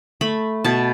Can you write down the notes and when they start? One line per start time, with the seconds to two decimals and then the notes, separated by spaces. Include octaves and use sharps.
0.21 A3 B5
0.64 B2 A5